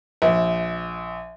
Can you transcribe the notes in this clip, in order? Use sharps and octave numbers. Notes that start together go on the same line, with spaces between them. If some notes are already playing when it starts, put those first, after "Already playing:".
A#1